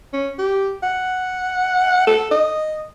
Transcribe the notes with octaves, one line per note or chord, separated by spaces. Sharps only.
C#4
G4
F#5
A4
D#5